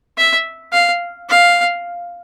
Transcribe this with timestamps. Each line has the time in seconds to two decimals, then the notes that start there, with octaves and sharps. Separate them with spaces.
0.18 E5
0.73 F5
1.29 F5